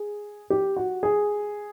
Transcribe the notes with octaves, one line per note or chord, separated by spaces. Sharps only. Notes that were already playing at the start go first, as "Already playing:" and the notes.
Already playing: G#4
G4
F#4
G#4